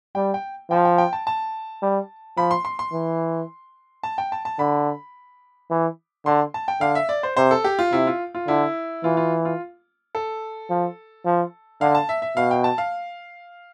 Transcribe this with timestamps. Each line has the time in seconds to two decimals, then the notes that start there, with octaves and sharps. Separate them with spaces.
0.15 G3 G5
0.34 G5
0.71 F3 G5
0.85 G5
0.98 G5
1.13 A5
1.27 A5
1.82 G3
2.37 F3 B5
2.51 C6
2.65 C6
2.79 C6
2.93 E3
4.03 A5
4.18 G5
4.32 A5
4.45 A5
4.59 D3 B5
5.70 E3
6.26 D3 C6
6.54 A5
6.68 G5
6.81 D3 F5
6.95 E5
7.09 D5
7.23 C5
7.37 C3 C5
7.51 A4
7.64 G4
7.79 F4
7.92 C3 E4
8.07 F4
8.35 F4
8.48 D3 E4
9.04 E3 F4
9.17 F4
9.45 F4
10.15 A4
10.70 F3
11.26 F3
11.81 D3 F5
11.95 A5
12.09 E5
12.22 E5
12.37 B2 F5
12.51 G5
12.64 A5
12.78 F5